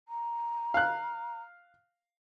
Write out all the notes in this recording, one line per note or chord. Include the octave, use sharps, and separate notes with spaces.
A#5
F5 F#6